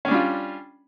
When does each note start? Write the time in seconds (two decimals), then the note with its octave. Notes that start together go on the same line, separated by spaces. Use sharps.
0.05 C#4
0.08 D4
0.11 G3
0.14 F4